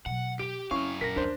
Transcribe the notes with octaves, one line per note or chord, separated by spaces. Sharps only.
B2 F#3 F#5
G4 D7
F#2 C4 C#4 E4 F5 C#6
A#1 A#4 A#6 B6
D2 D4 C5